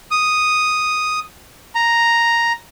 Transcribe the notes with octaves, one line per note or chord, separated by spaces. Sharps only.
D#6
A#5